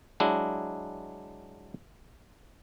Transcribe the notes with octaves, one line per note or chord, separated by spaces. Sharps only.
F#3 G#3 D4 E4